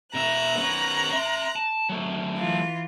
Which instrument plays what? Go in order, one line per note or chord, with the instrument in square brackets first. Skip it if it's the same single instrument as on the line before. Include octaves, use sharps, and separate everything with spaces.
[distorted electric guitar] B2 E5 [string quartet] A#5 F#6
[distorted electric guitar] B3 C#4
E5 C6
A5
F#3 A3
[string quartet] E3 F4